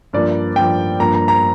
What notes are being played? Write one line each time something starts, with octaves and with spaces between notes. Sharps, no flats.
G2 F3 A#3 D5
G2 F3 A#3 G5
G2 F3 A#3 A#5
A#5
A#5